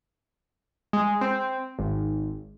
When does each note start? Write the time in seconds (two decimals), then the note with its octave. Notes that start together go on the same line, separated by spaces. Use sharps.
0.93 G#3
1.21 C4
1.79 G#1